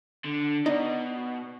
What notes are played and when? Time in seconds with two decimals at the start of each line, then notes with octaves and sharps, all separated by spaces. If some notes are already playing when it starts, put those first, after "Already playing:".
0.24 D3
0.66 B2 D#4 D5 D#5